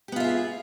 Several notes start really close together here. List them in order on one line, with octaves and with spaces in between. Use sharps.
G4 B3 F4 E5 G#4